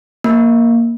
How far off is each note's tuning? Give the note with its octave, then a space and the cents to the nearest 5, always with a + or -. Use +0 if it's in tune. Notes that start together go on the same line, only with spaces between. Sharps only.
A#3 +0